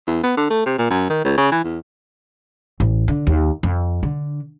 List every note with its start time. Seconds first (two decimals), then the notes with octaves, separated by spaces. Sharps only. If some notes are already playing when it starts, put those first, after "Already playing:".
0.07 E2
0.23 B3
0.37 D3
0.50 A3
0.66 C3
0.78 A#2
0.90 F#2
1.09 D#3
1.24 C#2
1.37 C#3
1.51 E3
1.64 E2
2.80 A1
3.08 D3
3.27 D#2
3.63 F2
4.03 D3